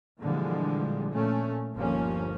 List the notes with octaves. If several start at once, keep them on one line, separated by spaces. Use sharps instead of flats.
A#2 D3 E3 F3 G3 G#3
A#2 A3 C#4
G1 D#2 F3 A#3 C#4